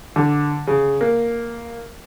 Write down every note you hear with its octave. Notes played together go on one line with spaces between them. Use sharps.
D3
C#3
A#3